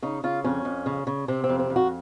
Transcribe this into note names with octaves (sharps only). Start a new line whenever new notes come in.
C#3 D#4
C#3 F4
F2 C#4
F2
C#3
C#3
C3 C4
C4
F2
C4
F2
F#4